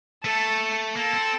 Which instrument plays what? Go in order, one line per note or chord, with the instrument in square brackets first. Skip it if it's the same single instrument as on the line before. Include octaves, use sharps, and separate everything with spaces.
[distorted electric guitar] A3 [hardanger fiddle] A4
[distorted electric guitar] A#3 [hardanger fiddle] A4
[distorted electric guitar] C4